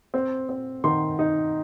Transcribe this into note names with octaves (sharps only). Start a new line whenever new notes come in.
C4
C4
D#3 C6
D#4